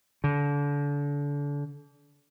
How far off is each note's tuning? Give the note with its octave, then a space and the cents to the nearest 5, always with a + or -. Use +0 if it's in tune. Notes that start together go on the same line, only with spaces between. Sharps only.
D3 -30